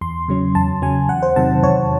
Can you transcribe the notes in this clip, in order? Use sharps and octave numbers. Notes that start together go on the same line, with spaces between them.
E2 C6
C#3 F#3 C#4
E2 A5
C#3 F#3 C#4 G#5
E2 F#5
C5
C3 D#3 F#3 A5
E2 C#5